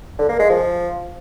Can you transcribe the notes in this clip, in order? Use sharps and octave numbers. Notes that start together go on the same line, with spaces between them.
D3
A#3
G#3
F3